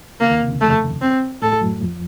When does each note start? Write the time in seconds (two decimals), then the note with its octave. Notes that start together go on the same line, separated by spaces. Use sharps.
0.20 C#3 A#3
0.30 D#2 D#3
0.40 C3
0.50 C#3
0.61 F2 F3 A3
1.01 C4
1.42 A2 A3 A4
1.52 A2 A3
1.62 F#2 F#3
1.82 F2 F3